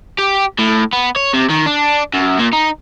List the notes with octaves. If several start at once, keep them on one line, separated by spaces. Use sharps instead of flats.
G4
A2
B3
C#5
C3
D#3
D4
F#2
A#2
D#4